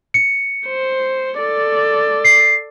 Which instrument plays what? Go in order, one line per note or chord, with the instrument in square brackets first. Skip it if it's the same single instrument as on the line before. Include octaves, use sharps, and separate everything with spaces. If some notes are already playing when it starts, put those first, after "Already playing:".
[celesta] C#7
[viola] C5
A4 D5
[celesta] C7